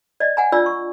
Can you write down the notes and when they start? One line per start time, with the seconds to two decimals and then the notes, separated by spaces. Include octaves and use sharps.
0.20 D5 D#5
0.37 F#5 G#5 A#5
0.52 D4 F4 D5 E6
0.66 C#6